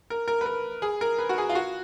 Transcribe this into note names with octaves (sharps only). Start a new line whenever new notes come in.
A#4
A#4
B4
A#4
G#4
A#4
B4
F#4
G#4
F4
F#4